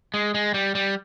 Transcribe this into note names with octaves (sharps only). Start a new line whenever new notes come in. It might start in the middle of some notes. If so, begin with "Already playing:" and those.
G#3
G#3
G3
G3